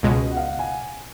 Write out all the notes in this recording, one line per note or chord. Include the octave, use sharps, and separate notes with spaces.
C#2 B2 G#3 D#5
F#5
F5
F#5
G#5